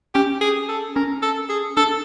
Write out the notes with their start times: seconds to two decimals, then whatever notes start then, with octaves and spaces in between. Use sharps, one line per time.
0.14 C#4 G4
0.41 G#4
0.69 A4
0.96 C#4 A#4
1.22 A4
1.49 G#4
1.77 D4 A4